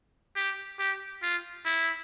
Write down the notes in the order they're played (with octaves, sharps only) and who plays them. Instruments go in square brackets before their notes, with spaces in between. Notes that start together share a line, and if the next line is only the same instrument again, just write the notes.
[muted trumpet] G4
G4
F4
E4